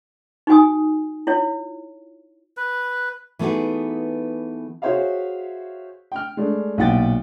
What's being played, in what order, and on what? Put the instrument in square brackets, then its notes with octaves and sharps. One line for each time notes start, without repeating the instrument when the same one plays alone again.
[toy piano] D#4 F#4 G#5 D#6
E4 F4 C#5
[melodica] B4
[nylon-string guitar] E3 A3 B3 D#4 F#4 G#4
[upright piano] F#4 G#4 C5 C#5 E5 F5
G5 F6
G#3 A3 D4
B1 A#2 E4 F#5 G5 A6